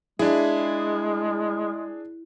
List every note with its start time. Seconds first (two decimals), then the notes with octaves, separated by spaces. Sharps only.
0.19 G#3 D4 E4 G#4